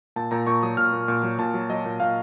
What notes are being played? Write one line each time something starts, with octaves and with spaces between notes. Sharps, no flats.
A#2 A5
A#2 A#5
A#2 C#6
F#3 D#6
A#2 F6
A#2
A#2
F#3
A#2 A5
F#3
F#3 D#5
A#2
A#2 F5